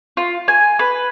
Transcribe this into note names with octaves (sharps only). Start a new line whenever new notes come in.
F4
G#5
B4